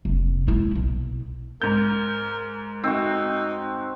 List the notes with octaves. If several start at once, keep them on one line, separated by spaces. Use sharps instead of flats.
F1
G#3 E4
B1
G#2 A#4 G6
C4 D#4 F#4